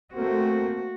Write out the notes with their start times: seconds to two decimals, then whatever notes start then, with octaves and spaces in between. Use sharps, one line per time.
0.14 A3 A#3 C4 F#4